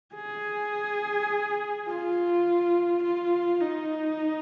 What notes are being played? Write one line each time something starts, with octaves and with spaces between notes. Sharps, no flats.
G#4
F4
F4
D#4